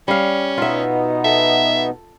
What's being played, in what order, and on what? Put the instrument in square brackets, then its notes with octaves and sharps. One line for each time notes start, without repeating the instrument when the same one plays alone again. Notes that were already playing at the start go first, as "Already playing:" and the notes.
[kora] G3 F5 [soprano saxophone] C#4
[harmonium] B2 B3 D#4 [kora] F4 E5
[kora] A4 [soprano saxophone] E5